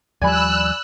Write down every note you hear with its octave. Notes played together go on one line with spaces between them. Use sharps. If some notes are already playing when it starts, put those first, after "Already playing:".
D#2 F3 G3 D5 G#5 B5 E6 F#6